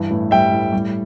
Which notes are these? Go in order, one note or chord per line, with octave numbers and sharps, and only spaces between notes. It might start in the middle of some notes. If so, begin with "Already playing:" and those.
Already playing: G2 E3
A2
G3 E5 G5
A2
G3